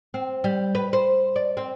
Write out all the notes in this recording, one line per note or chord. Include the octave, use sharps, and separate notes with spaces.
C4
G3
B4
C5
D5
C4